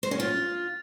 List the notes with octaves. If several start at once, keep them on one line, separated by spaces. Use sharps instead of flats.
C5
C#4
F4